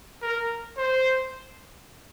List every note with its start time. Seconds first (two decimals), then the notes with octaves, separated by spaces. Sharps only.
0.22 A#4
0.78 C5